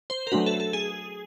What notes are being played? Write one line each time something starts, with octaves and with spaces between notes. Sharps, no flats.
C5
A#4
F#3 A3 D4 F#4 B4
A4
A4
G#4